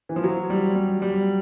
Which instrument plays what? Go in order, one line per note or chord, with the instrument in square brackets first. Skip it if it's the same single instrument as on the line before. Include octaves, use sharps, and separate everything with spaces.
[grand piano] E3
F3
F#3
G3
G3
G3